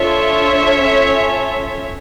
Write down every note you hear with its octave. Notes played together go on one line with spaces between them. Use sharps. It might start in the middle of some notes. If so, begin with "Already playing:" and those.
Already playing: D4 F4 A4 C#5 E5
C#4 F4 A4